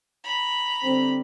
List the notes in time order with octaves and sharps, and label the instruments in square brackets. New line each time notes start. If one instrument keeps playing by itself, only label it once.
[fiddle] A#5 B5
[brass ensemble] D3 G3 C4